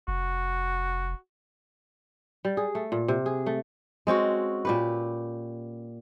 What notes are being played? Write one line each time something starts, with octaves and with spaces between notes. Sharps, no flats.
F1 F#4
G3
G#4
A3
A#2
C3
G#4
A3
G#3 C4 C#4 F#4
A#2 G4 B4